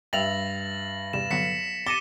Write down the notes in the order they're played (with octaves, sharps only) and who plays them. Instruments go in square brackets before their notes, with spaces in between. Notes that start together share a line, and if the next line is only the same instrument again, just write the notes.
[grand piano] G2 E5 F7 [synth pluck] G5 [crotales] A6 A#6 F#7
[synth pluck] E2 C3 G3 [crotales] E7
[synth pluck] D3 F#3 B3 [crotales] B6 C#7
[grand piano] D6 [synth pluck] A6 A#6 C#7 [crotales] D#7 E7 G7